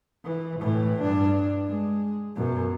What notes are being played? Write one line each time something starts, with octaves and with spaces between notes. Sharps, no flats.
E3
A2 E3
G2 D4
G#3
F#2 B2